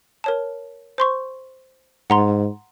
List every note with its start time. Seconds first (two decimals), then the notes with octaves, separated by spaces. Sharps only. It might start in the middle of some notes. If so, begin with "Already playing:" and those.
0.24 A#4 C#5 A5
0.98 C5 C6 C#6
2.10 G#2 F#5 A#5 C6